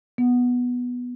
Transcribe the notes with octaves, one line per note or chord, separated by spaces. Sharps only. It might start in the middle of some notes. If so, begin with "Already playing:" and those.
B3